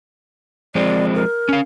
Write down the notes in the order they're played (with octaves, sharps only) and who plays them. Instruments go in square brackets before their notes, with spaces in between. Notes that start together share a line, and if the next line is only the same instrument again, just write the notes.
[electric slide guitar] F3 G#3 C4 [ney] D5
[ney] A#4
[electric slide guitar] C#4 F5